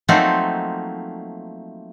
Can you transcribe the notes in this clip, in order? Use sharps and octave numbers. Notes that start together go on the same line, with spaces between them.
F3 F#3 A3 A#3 C4 D#4